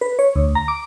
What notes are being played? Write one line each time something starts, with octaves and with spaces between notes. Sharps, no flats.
B4
C#5
D2
A#5
D6